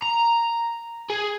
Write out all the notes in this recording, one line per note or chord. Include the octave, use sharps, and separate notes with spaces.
A#5
G#4